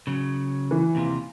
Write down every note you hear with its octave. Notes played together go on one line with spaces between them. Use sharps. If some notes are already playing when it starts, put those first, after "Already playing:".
C#3 F#3
E3
D#2 C3 F4